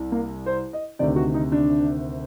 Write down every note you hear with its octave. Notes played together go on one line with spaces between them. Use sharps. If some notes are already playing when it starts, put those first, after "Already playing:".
Already playing: C2
A#3
C5
D#5
D2 C3 D#3 D5
F#4
D#4
D4